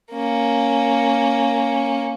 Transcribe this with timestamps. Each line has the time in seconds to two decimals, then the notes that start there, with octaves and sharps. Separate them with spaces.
0.12 A#3 C#4